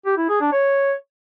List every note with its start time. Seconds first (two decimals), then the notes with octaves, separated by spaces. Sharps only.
0.06 G4
0.17 E4
0.29 G#4
0.41 D4
0.52 C#5